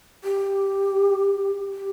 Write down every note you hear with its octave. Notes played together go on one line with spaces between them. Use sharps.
G4
G4